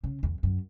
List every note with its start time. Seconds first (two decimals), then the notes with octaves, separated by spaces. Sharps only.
0.04 C#3
0.23 E2
0.43 F#2